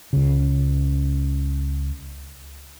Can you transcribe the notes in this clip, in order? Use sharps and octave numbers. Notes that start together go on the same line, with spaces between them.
C#2 C#3